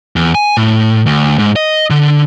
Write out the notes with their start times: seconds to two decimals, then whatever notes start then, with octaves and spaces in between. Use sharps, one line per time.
0.16 E2
0.35 G#5
0.57 A2
1.06 D2
1.39 G#2
1.56 D#5
1.90 D3